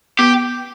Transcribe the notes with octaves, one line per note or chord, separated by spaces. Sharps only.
B3 G4